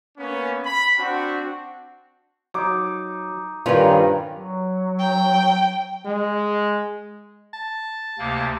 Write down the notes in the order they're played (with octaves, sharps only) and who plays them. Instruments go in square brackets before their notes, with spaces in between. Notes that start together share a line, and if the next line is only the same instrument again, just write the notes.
[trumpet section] A#3 B3 C#4
B5
C4 D4 F#4
[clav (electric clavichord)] F#3 [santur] D#4 D6
[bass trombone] G2 [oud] D#3 F4 [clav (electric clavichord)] C4 C#4 B4
[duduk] F#3
[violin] G5
[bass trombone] G#3
[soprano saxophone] A5
[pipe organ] D2 C3 A#3